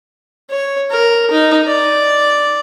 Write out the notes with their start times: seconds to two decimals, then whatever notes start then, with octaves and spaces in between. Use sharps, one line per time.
0.50 C#5
0.91 A#4
1.31 D#4
1.67 D5